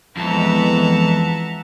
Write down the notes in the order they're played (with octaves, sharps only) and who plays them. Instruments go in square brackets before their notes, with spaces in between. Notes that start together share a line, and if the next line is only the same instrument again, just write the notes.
[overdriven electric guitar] F2 [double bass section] E3 G#3 B3 [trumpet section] E5 F#5 A#5 [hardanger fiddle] A5